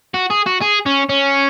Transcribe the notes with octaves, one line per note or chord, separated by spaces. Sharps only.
F#4
G#4
F#4
G#4
C#4
C#4